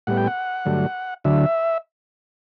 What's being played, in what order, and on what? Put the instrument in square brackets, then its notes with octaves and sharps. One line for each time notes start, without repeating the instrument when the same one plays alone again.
[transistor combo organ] A2 G3 B3 F#5
G5
F#5
G2 D3 F#3 A3
D2 D3 F#3 E5